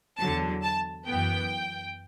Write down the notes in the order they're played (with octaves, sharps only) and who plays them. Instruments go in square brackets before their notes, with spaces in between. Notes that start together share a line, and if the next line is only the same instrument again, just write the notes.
[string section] E2 D3 F#3 A5
A5
F#2 E3 B3 G5